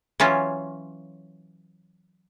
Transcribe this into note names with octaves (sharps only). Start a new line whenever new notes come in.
E3 F#3 C#4 F4